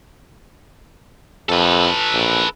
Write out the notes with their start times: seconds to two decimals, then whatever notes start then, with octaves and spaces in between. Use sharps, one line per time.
1.49 F2 A4 B4
2.13 A#1